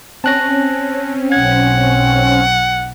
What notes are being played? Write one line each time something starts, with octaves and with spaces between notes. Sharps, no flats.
C4 C#4 A5 F#6 A#6
B1 F#5 G#6